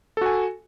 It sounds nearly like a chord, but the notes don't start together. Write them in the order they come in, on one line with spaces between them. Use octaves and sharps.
A4 F#4 G#5